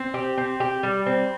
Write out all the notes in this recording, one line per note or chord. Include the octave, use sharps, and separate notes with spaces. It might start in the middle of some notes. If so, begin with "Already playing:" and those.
Already playing: C4
G4
C4
G4
G3
C4